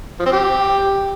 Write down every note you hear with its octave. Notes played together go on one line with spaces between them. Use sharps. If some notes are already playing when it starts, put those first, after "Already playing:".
F3
C4
G4